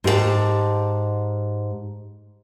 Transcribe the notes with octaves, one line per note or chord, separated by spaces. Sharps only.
G#2 G4 G#4 A5